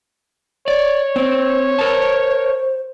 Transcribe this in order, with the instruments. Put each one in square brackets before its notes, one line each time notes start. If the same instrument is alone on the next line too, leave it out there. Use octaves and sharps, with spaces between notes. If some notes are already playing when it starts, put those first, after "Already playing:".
[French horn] C#5 [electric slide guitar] D5
[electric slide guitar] C4 [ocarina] C5
[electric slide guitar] A#4 A5 [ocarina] C5